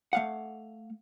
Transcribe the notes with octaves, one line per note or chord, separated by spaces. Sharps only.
A3 F5 F#5